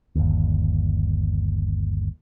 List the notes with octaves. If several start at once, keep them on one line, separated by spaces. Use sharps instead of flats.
G1 D#2